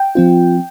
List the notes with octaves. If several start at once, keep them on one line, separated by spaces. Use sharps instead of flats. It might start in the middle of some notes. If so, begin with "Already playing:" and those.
Already playing: G5
F3 C4 F4